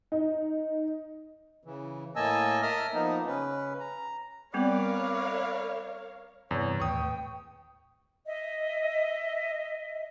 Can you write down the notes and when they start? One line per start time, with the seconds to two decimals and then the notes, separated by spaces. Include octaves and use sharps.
0.12 D#4
1.64 C#3 E3
2.16 A2 A#3 D#5 G#5 A5 E6
2.62 A#4 D#5 E5 A5 D#6 F6
2.94 F3 A#3 B3 D#4
3.26 C#3 C#4 B4
3.80 A#5
4.54 G3 B3 C4 A#4 B4 C#5 D5 F5
6.51 E2 G2 C3 C#5
6.80 D#2 A2 B4 G5 C#6 D#6
8.26 D#5 E5